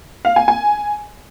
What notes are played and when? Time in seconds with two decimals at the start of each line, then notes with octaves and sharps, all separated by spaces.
0.25 F5
0.36 G#5
0.48 G#5